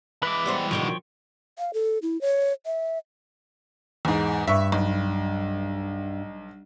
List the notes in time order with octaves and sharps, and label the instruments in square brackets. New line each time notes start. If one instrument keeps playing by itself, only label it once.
[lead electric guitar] E3 G#3 [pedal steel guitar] B4 E5 D6
[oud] G3 B3 C5
[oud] B2 D3 D#3 [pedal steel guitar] F3 C#5 G5
[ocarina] F5
A4
E4
C#5
E5
[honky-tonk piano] E2 G#2
[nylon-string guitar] G2 [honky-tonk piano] E5 C#6
[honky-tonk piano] B1